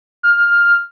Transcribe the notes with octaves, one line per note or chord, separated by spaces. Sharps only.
F6